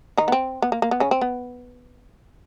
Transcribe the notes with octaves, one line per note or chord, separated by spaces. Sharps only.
D#3 D#4
B3
C4
B3
A#3
A#3
B3
C#3 C#4
C4
B3